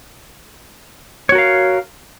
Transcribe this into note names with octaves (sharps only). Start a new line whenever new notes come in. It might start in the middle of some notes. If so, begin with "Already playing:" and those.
F#4 A#4 C#5 F5